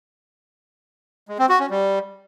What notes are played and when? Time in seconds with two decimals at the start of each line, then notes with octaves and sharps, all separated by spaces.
1.29 G#3
1.39 C4
1.49 F#4
1.60 C#4
1.70 G3